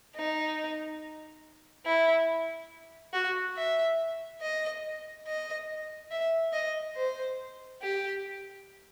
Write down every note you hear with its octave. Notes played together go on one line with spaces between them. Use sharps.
D#4
E4
F#4
E5
D#5
D#5
E5
D#5
C5
G4